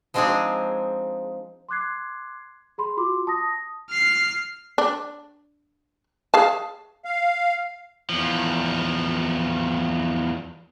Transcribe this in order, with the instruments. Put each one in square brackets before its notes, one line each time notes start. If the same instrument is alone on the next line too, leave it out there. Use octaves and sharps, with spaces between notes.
[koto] F3 G#3 C4 D4 D#4 G#4
[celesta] C6 D6 F#6 G#6 C7
G#4 B5 C6
F4 F#4 C6 D6
A5 D#6 A#6
[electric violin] F6 C7
[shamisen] D4
G#4 F5 A5
[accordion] F5
[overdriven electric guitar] E2 F3